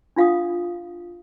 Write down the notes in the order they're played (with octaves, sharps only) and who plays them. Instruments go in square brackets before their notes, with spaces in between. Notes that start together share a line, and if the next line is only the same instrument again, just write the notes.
[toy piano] D4 F4 F5 F#5 D#6